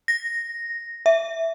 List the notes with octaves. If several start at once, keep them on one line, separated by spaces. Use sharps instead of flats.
A#6
E5